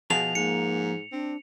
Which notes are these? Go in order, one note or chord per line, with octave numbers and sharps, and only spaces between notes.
B2 F3 G#4 A5 F7
G#2 A#3 C#7
C4 D4